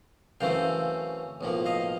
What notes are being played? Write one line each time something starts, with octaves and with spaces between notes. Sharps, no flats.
F#2 C#3 E3 A3 C4 F5 G5
B1 A2 F3 A#3
D#5 F5